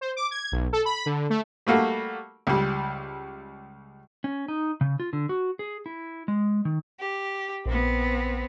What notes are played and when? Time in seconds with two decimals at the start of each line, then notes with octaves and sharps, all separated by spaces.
0.01 C5
0.16 D6
0.31 G#6
0.52 B1
0.73 A4
0.85 B5
1.06 D3
1.30 A3
1.67 G3 A3 A#3 F#4
2.47 C#2 G3
4.24 C#4
4.48 D#4
4.81 C#3
5.00 F4
5.13 D3
5.29 F#4
5.59 G#4
5.86 E4
6.28 G#3
6.65 D#3
7.00 G4
7.66 A#1 B3 C4